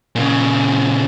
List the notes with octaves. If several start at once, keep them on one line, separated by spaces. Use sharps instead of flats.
A#2 C#3